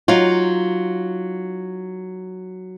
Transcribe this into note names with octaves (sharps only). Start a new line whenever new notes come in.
F#3 D#4 F4